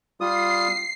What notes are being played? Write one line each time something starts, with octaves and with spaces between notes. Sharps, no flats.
G3 F4 D#6 C7